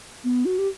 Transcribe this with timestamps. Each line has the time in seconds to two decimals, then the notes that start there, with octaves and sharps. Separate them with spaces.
0.24 B3
0.45 F#4
0.58 G4